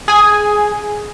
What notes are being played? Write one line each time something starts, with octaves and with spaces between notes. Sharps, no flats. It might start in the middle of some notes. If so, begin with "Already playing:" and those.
G#4 G#5